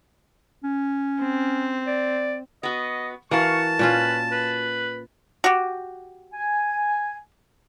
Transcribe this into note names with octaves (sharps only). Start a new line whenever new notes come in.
C#4
C4
D5
B3 F#4 D#5
E3 F#4 A#4 F5 A5 C#6
A#2 C#4 F4 B4
B4
F#4 G4
G#5